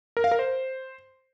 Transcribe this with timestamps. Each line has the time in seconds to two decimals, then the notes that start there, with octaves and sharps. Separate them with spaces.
0.17 A#4
0.24 F5
0.31 A#4
0.39 C5